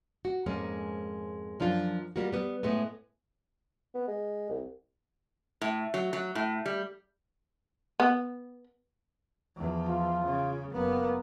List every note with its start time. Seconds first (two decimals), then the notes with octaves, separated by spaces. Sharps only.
0.25 F#4
0.46 F2 G#2 G#3 A#3 C#4
1.60 F#2 F3 D4 F4
2.16 G3 A#3 F4 F#4
2.33 G3 B3
2.63 A2 G#3 A3 B3
3.95 B3
4.08 G#3
4.50 C2
5.61 A2
5.94 F#3
6.13 F#3
6.35 A2
6.66 G3
8.00 B3
9.56 E2 F3
9.89 F4
10.25 C#3
10.73 F#1 A#3 B3